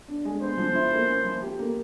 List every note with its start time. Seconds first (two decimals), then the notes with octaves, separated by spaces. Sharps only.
0.08 D4
0.25 G#3
0.41 B3 C5
0.58 F3
0.75 E4
0.92 A#3
1.08 C#4
1.25 F3
1.42 G4
1.59 A#3